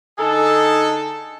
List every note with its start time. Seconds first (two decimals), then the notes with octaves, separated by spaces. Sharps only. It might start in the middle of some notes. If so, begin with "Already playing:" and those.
0.18 D3 D#4 G#4 A4